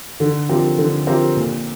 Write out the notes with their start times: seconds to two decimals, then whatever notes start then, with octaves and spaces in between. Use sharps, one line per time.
0.20 D3
0.49 F3 C4 G4 A#4
0.78 D3
1.07 F3 C4 G4 A#4
1.36 A#2